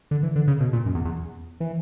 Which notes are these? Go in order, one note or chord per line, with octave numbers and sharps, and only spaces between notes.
D3
E3
D3
C#3
B2
A#2
F#2
E2
E2
E3